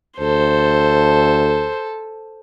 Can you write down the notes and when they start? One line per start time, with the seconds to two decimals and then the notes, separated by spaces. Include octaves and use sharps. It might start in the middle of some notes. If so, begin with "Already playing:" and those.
0.19 D2 A4 C5